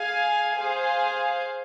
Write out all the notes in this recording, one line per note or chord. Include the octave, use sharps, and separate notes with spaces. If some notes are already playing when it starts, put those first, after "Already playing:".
Already playing: G#4 F5 G#5
G#4 C5 F5 G#5